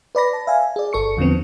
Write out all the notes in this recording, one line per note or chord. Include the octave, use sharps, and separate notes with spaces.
B4 D5 B5 A#6
A5
E5 F5 G#5
G#4 D5
G1 A4 C#6 C#7
E2 D3 F3 B3 C4